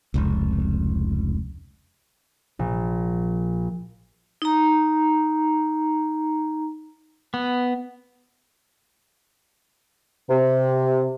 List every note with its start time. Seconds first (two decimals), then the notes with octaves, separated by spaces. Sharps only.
0.14 F1 C#2
2.59 A#1
4.42 D#4 A#5
7.34 B3
10.29 C3